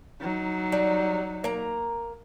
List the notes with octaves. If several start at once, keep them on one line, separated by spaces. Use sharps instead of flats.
F#3 D#4
G3
A#3 A#5